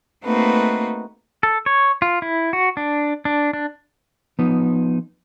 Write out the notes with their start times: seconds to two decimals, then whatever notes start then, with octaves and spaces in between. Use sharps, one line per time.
0.24 A3 A#3 C4 D#4 F#4 B4
1.43 A4
1.66 C#5
2.02 F4
2.22 E4
2.53 F#4
2.77 D4
3.25 D4
3.53 D4
4.39 F3 B3 D#4